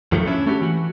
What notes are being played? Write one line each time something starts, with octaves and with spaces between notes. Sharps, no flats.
F2 D#3 F3 F#3 A3
C#4 D4 E4 E5
A3 C#4 F#4 G4
E3 F#4